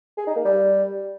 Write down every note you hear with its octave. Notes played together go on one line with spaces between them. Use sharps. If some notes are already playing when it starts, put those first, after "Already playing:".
G#4
D#4
A#3
G3